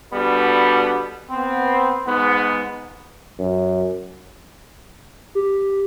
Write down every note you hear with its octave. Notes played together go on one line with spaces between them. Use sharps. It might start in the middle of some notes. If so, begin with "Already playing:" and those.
B2 D3 G3 B3
B3 C4
G#2 B3
F#2
G4